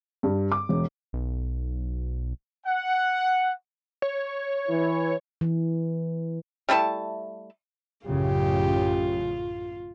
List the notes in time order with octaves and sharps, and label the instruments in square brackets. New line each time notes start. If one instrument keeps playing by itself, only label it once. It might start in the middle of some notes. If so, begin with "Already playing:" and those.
[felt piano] G2
D6
E1
[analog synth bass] B1
[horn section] F#5
[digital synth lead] C#5
[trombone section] E3 E4
[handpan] E3
[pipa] G3 A3 E4 A5
[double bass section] A1 F#2 C#3 [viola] F4 [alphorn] G4